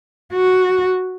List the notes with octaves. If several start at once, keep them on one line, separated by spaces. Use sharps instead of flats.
F#4